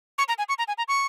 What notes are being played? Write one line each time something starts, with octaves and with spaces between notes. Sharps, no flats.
C#6
A#5
G#5
C#6
A#5
G#5
A#5
C#6